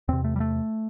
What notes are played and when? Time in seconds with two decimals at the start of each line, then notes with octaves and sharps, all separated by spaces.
0.08 E2 C3 C4
0.24 A3
0.36 G3
0.40 A3